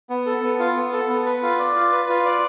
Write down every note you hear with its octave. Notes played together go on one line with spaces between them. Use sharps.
B3
A4
B3
F4
B3
A4
B3
B4
F4
D5
F4
B4
F4
D5